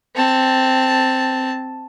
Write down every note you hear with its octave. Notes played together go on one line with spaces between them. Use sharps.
C4 A5